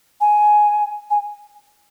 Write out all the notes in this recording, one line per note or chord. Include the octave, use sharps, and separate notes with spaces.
G#5
G#5